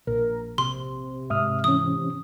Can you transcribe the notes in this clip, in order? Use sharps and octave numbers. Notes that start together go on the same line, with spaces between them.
A#1 A#4
C3 C6
G#2 E5 D#6 F6
E3 C#4 D#6